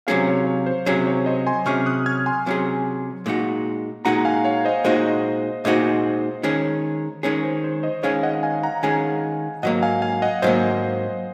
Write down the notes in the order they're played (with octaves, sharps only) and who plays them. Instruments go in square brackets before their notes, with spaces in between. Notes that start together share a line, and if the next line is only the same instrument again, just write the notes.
[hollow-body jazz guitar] C3 F#3 C#4 G#4 [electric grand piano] C#5 F5
[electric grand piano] C#5 F5
C#5
C5
[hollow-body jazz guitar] C3 F#3 C#4 G#4 [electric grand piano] C#5
[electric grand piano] C#5
C5 D#5
G#5 C6
[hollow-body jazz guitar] C3 F#3 C#4 G#4 [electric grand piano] C#6 F6
[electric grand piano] D#6 F#6
F6 G#6
G#5 C6
[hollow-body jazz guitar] C3 F#3 C#4 G#4
A#2 G#3 D#4 F#4
[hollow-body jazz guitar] A#2 G#3 D#4 F#4 [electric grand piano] F#5 A#5
[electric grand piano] F5 G#5
C#5 F5
C5 D#5
[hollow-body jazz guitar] A#2 G#3 D#4 F#4 [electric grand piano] C5 D#5
[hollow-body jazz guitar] A#2 G#3 D#4 F#4 [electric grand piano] C5 D#5
[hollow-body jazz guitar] D#3 G#3 C#4 G#4
[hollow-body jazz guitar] D#3 G#3 C#4 G#4 [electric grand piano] C#5
[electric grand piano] C5
C5
C5 D#5
[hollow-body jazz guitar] D#3 G#3 C#4 G#4 [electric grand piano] C#5 F5
[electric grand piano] D#5 F#5
F#5
F5 G#5
F#5 A#5
[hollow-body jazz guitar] D#3 G#3 C#4 G#4 [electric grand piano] F5 G#5
[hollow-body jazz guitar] G#2 F#3 A#3 [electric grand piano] D#5 F#5
[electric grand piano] F5 G#5
F5 G#5
D#5 F#5
[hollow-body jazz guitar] G#2 F#3 A#3 [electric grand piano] C5 D#5